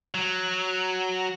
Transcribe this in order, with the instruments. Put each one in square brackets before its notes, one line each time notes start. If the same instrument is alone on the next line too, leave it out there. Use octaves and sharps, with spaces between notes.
[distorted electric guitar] F#3